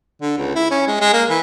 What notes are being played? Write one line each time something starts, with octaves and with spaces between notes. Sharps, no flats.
D3
C#2
E4
C#4
G#3
G#3
A#3
E3